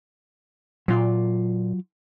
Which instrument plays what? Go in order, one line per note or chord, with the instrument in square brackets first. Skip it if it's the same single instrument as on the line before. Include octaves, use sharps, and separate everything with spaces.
[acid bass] A#2 [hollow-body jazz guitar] F#3 F4 D5